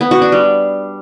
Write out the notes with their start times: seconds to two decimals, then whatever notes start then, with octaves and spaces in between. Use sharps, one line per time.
0.01 B3
0.11 F#4
0.22 D4
0.32 G3